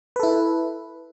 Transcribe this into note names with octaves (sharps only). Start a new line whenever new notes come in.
E4 A4 B4